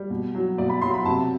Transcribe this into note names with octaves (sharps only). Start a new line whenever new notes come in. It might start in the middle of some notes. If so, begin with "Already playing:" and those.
Already playing: G3
B2
F#3
B2 D5
B5
F#3 C6
B5
C3 A5